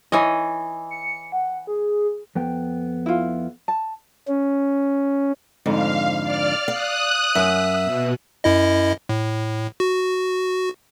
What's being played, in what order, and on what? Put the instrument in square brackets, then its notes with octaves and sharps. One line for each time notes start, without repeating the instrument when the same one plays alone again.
[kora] E3 C#5 D#5
[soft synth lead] C#7
F#5
G#4
[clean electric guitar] F2 B3 G5
[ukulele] E4 F4
A5
[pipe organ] C#4
[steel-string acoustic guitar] F2 G#2 D3 [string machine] F5
[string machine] D5 F6
[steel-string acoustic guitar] F5 [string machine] D#6 F#6
[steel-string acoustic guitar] F#2 [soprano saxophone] E5
[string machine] B2
[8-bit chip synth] F#2 E4 D#5
A2
F#4